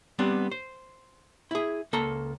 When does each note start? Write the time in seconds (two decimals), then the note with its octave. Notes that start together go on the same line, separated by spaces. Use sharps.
0.19 G3 B3 C4 D4
0.52 C5
1.51 E4 G#4
1.93 C#2 A#3 A4 A#5